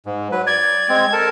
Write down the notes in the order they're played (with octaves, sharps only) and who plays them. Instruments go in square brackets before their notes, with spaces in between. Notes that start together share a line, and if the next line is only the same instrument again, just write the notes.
[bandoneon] G#2
F#3 B4
[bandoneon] D5 [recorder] G#6
[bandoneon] G#3 C4
A4 A#4 A5